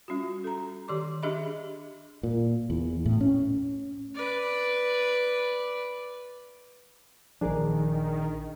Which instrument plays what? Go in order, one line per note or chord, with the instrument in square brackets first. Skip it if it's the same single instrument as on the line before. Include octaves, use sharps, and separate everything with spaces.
[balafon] G3 C#4 F4 F#4
F#4
A4 A#5
D#3 G4 D5 C6 D6
D4 G4 G#4 D#5 E5 B5
[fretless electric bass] A#2
E2
A2
C#4
[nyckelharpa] B4 D5
[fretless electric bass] A#1 F3 [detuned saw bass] D#3 [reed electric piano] D4 G#4 A#4